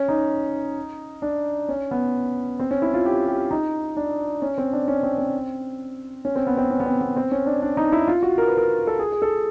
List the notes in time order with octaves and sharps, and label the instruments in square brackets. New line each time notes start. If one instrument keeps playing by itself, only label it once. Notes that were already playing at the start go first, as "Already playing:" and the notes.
Already playing: [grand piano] C#4
D#4
D4
C#4
B3
C4
C#4
E4
F4
G4
G4
D#4
D4
C#4
C4
D4
C#4
C4
C4
C#4
C4
B3
C4
C#4
B3
C4
B3
C4
C#4
D4
D4
D#4
E4
F4
F#4
A#4
B4
A#4
A4
G#4
G#4
A4